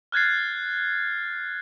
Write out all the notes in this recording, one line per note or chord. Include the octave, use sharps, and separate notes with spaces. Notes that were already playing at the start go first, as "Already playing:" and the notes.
F6 F#6 G#6 A6 C7